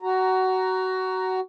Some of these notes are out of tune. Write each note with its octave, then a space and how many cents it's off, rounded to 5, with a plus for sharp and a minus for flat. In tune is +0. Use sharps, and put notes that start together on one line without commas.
F#4 +20 A#5 +0